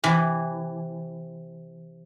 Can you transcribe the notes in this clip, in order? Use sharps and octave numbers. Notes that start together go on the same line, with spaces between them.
C3 E3